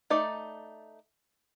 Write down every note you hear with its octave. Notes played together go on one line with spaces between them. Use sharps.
A3 D#4 D5